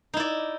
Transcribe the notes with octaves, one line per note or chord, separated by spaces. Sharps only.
D#4 E4 D5